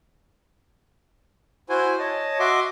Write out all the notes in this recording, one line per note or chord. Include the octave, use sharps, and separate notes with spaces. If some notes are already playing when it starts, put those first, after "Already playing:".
E4 F#4 C5 G#5
C#5 D#5 A5
F#4 D#5 E5 C6 D6